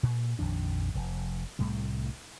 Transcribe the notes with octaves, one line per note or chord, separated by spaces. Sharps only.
A#2
A#1 F2 D#3 D4
F1
C2 A2 G3 A3